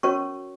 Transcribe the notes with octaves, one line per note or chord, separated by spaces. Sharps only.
C#4 F#4 A#4 C#5 C#6